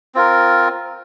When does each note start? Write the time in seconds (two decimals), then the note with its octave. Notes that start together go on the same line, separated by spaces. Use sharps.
0.15 C4 F4 A#4